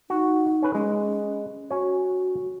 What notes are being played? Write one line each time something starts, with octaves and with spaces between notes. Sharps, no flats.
D#4 F#4
C#4 B4
G#3 C#4
C#4 F#4 C#5